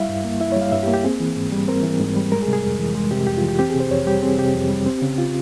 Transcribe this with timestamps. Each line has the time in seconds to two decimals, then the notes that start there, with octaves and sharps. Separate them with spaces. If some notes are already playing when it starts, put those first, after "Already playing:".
Already playing: G3 E4 E5 F5
0.09 G2
0.25 A#3
0.40 E4 E5
0.52 G3 C#5
0.61 F5
0.72 G2 E5
0.83 G4
0.88 A#3
0.93 G4
1.04 C4 G#4
1.20 E3
1.36 G#2
1.52 G3
1.68 C4 A#4
1.83 E3
2.00 G#2
2.16 G3
2.32 G#3 A#4
2.43 G#4
2.47 C3
2.53 G#4
2.63 F2
2.79 E3
2.95 G#3
3.11 C3 G4
3.27 F2 G4
3.37 F4
3.43 E3
3.49 G4
3.59 C4 G4
3.70 C3 G#4
3.80 C5
3.91 F2 C#5
4.06 G3 G4
4.23 C4 G#4
4.38 C3 G4
4.54 F2
4.70 G3
4.86 C4
5.02 C#3
5.18 F4